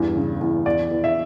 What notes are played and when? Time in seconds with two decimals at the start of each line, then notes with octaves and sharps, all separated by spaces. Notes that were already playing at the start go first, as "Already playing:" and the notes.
Already playing: E2 G2
0.16 C#3
0.41 E2
0.66 E2 D5
0.91 E2
1.04 E5